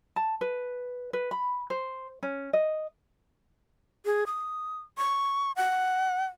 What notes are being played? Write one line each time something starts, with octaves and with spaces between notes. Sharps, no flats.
A5
B4
B4
B5
C5
C#4
D#5
G#4
D#6
C#6
F#5